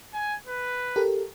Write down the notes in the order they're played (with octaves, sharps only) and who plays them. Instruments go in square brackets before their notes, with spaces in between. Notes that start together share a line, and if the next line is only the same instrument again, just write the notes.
[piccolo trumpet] G#5
B4
[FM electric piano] G4 A4 A#4